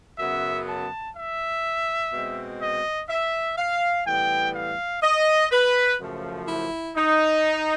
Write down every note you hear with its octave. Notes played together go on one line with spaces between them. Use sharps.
F#2 C#3 F#3 B3 E5
A5
E5
B2 G#3 C4
D#5
E5
F5
A2 E3 G3 B3 G5
F5
D#5
B4
F#2 C#3 F3 A3
E4
D#4